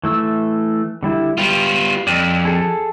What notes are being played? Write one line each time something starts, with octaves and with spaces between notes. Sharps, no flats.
E3 A3 E6
D3 G3 E4
G3 B3 F4
F2 D5
G#4 A4